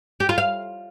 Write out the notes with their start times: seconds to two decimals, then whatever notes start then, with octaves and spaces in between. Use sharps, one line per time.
0.20 G4
0.29 F4
0.38 F5